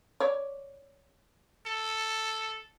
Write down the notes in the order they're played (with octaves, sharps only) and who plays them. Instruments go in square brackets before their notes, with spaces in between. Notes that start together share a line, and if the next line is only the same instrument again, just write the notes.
[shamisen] C#5 D5
[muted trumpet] A4